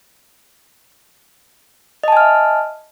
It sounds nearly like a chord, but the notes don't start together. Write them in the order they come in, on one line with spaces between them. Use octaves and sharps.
D#5 A5 G#5 F6 E5